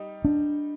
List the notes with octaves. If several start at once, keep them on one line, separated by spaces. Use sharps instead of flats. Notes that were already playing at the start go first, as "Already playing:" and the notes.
Already playing: G3 D#4
D4